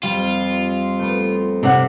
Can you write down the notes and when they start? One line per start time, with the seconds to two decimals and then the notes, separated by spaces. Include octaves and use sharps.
0.03 F2 G3 F4
0.99 A3 B3
1.63 C3 F#5